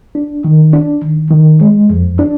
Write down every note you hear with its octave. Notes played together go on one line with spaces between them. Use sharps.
D4
D#3
D4
D#3
D#3
G#3
F2
D4